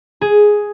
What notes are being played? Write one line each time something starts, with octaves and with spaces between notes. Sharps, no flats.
G#4